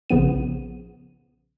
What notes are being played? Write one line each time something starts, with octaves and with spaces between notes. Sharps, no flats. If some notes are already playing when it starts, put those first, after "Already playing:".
A#1 C#3 F3 B3 D#7